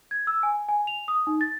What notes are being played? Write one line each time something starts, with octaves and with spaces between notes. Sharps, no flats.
G#6
E6
G#5
G#5
F7
D#6
D#4
A6